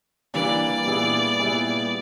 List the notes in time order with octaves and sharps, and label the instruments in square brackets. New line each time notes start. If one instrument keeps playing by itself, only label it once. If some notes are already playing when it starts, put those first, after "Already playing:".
[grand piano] E3 G3 A#3 D4 [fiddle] D5
[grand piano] A#2 G3 B3 E4 G#4
A#2 G3 B3 E4 G#4